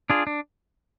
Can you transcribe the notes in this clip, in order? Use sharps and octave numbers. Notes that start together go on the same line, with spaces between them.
D4 F4 G#4
D4